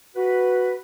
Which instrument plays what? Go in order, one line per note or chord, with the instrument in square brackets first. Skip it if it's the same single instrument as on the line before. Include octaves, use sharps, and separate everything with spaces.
[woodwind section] F#4 B4